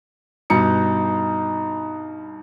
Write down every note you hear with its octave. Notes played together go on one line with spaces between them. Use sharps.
G2 B2 D#4 C#7